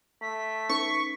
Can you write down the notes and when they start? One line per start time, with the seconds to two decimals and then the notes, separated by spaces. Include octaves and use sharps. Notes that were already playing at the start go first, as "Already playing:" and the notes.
0.22 A3 B6
0.69 C#4 D#4 C#6